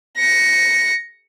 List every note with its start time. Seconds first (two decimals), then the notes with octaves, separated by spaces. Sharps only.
0.18 A#6 C#7